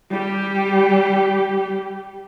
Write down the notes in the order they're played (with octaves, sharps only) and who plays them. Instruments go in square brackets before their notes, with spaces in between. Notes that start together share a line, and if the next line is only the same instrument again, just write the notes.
[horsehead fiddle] G3 G4